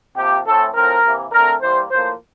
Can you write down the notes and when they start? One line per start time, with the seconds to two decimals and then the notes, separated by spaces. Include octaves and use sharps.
0.17 C3 F3 A#3 G4
0.46 A2 E3 A3 C4 A4
0.74 A2 F3 C4 A#4
1.03 C3 E3 A#3
1.32 D3 A3 C4 A#4
1.61 E3 G3 A#3 C5
1.90 A2 F3 A#3 C5